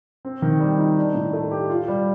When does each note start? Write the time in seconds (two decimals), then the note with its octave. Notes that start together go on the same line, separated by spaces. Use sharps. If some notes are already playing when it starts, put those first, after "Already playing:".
0.25 C4
0.42 D#3
0.60 G3
0.78 D#4
0.97 D4
1.14 A2
1.33 A3
1.51 G4
1.69 F4
1.88 G3